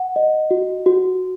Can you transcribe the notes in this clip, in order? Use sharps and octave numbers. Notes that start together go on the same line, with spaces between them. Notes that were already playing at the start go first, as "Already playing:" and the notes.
Already playing: F#5
D#5
F#4
F#4